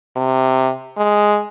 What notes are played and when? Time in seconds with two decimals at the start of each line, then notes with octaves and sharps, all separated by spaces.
0.16 C3
0.97 G#3